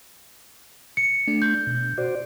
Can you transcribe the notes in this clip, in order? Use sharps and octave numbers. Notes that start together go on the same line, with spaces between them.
C#7
A3 D4
G6
B2
F#4 C5 D5